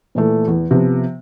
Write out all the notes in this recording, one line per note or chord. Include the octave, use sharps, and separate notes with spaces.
A#2 E3 A3
E2
C3 F3 B3